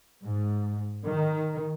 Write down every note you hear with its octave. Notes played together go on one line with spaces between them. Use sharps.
G#2
D#3